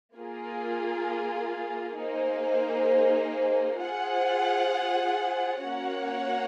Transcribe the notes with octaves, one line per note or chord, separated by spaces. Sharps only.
A#3 F4 G#4
A#3 D#4 G#4 C5
F4 G#4 C5 F#5
A#3 C#4 F#4 C#5 F#5